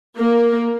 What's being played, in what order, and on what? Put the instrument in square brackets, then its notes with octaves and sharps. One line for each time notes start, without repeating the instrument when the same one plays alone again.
[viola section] A#3